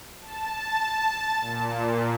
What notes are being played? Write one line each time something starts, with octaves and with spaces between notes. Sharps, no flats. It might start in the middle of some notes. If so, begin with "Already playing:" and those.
A5
A#2